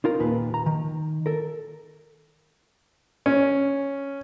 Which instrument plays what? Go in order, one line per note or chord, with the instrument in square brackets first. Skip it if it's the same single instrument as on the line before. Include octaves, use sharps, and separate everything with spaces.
[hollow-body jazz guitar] D#4 F4 A#4
D#2 A#2 B4
A#5
D#3
A4 A#4
[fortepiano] C#4